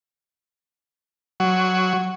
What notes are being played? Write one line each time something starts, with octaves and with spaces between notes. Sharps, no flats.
F#3